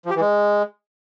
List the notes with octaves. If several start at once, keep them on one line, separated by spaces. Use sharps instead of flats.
F3
G4
E3
G#3